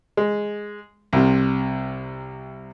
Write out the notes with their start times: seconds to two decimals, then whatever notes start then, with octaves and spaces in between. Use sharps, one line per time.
0.17 G#3
1.13 C2 C3